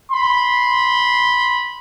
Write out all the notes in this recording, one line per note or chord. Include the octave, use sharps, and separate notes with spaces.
B5 C6